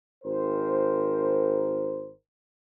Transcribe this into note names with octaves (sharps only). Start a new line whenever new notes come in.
G#1 A#4 C5